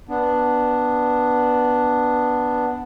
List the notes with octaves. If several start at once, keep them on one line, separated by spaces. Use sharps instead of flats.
B3 D4